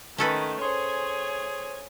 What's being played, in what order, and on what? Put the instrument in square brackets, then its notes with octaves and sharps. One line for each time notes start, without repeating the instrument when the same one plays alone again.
[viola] D#3 [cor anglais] A3 [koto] C#4 A4 B4
[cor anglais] G#4 [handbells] C5 C6 [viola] C#5 G#5